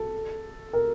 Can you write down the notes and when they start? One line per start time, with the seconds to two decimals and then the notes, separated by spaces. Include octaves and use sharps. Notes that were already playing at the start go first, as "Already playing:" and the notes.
Already playing: A4
0.73 A#4